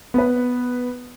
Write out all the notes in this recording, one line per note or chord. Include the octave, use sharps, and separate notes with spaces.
B3 B4